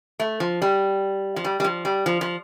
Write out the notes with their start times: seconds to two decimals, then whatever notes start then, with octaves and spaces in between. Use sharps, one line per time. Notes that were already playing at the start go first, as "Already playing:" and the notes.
0.19 A3
0.40 F3
0.62 G3
1.36 F3
1.44 G3
1.60 G3
1.64 F3
1.85 G3
2.06 F3
2.21 F3